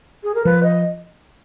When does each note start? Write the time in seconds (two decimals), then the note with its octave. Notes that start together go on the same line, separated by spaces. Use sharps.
0.24 G#4
0.35 A#4
0.45 F3 B4
0.63 D#5